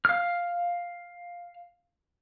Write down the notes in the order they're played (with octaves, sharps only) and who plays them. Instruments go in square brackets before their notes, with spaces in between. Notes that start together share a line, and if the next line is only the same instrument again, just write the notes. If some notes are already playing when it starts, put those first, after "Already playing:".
[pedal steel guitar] F5 F6